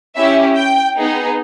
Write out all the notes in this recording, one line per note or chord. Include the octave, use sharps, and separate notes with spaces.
C#4 E4 G4 E5
G5
B3 D#4 G#4